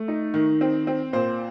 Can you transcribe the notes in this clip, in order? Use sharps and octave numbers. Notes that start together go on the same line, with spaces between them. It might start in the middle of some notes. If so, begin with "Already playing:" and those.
Already playing: A3
D#4
D#3
C4
C4
A#2 C5